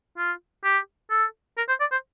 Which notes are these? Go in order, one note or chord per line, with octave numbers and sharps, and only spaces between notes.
F4
G4
A4
A#4
C5
D5
C5